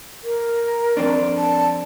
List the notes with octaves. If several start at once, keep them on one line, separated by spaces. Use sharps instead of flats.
A#4
F2 C4 D4
A5